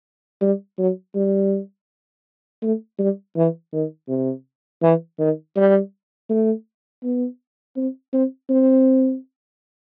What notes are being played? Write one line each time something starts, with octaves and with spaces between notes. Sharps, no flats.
G3
F#3
G3
A3
G3
E3
D#3
C3
E3
D#3
G3
A3
B3
C4
C4
C4